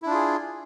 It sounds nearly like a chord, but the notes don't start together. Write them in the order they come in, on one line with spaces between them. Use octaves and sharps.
E4 D4 F4 G#4